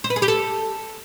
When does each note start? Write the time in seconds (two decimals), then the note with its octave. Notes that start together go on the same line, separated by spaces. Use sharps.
0.04 C5
0.10 B4
0.16 G#4
0.22 G4
0.28 A4